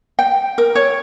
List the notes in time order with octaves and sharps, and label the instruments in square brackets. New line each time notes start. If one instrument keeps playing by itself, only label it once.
[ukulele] G5
A#4
C#5